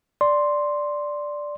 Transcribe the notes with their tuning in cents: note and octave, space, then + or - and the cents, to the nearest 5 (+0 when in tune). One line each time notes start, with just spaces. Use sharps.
D5 +0 C6 +0